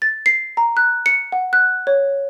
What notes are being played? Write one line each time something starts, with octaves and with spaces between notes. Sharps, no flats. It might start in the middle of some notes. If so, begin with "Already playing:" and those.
A6
C7
A#5
F#6
C#7
F#5
F#6
C#5